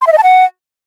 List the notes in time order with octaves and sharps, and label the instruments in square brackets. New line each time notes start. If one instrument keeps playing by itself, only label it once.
[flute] C6
E5
D#5
A5
F#5